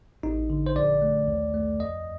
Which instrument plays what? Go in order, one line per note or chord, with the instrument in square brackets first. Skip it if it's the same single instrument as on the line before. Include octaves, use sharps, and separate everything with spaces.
[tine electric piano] A1 D#4
D3
C5
A#1 D5
A3
D#2
A3
F2 D#5